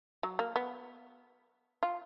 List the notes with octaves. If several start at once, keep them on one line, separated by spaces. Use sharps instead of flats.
F#3
A#3
B3
F4